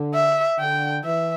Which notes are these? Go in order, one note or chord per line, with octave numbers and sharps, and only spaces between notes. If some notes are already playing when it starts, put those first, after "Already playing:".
Already playing: D3
E5
D3 G5
E3 E5